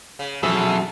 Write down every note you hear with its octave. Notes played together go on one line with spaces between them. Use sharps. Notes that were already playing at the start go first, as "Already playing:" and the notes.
C#3
F2 G#2 B2 E3 F#3 G#4 A4 E5